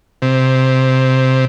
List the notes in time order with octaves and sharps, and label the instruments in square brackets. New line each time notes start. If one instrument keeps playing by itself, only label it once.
[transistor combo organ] C3